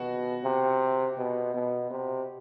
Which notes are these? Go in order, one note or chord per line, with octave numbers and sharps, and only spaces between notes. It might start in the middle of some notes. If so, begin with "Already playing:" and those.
Already playing: B2 F#4 F#5
C3
B2
B2
C3